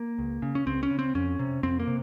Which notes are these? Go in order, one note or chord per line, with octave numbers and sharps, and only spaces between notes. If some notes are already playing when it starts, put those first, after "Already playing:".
Already playing: A#3
C#2
C#3
C#4
C#2 C4
C#4
C#3
C4
F2 C#4
C3
F2 C4
A#3
C3